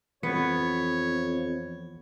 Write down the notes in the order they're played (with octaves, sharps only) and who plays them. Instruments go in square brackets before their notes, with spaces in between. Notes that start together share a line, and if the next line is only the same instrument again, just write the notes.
[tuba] F2 [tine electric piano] E3 C#7 [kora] B3 [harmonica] C#5